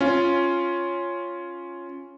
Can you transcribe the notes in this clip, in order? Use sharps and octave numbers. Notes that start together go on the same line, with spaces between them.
C#4 F4